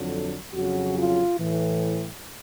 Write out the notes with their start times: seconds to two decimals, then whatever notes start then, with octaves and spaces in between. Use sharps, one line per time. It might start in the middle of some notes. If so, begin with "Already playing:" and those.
Already playing: F2 D3 F#3
0.54 F2 C#3 F#3 F#4
0.98 F4
1.39 A2 E3